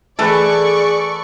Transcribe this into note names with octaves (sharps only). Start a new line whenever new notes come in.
E3 A3 G#4 A4 B4 D5 C#6